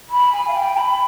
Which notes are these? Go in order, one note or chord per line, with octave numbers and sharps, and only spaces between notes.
B5
G#5
F5
G5
B5